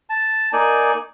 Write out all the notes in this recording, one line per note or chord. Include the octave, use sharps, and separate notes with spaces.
A5
A#3 D#4 D5 G#5